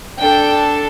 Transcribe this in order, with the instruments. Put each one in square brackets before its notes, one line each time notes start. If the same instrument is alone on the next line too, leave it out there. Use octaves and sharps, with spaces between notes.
[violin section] D4 A4 G5